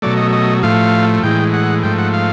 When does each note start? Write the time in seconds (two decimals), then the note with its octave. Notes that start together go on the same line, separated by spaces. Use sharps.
0.02 B2 F#3 A3 D5
0.17 D#5
0.33 D#5
0.63 A2 F3 A3 F5
1.23 A2 E3 G#3 G5
1.53 F#5
1.83 G#2 F3 A3 G5
1.98 F#5
2.14 F5